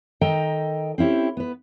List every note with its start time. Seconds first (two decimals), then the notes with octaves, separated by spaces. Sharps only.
0.21 D#3 A4 D#5 G5 A#5
0.98 C4 C#4 E4 G4
1.37 B3 B4